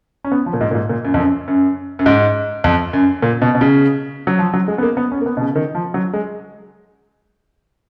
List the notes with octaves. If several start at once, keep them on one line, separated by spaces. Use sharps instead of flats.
C#4
B3
F3
A#2
G#2
A#2
G#2
A#2
F#2
F2
F#2
F#2
F#2
G#2
F2
F#2
A#2
B2
B2
C#3
F#3
F3
F#3
G#3
B3
A#3
B3
C#4
A#3
B3
B2
C#3
D#3
F3
F#3
G#3